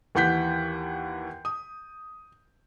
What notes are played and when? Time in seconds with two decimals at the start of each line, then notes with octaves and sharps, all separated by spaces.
0.15 D#2 E3 F#5 G6 B6
1.45 D#6